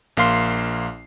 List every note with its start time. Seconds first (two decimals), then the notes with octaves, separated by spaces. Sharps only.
0.17 A#1 A#3 F5 C6 C7